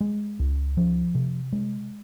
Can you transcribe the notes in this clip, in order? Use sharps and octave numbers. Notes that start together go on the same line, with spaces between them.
G#3
C#2
F3
C3
G#3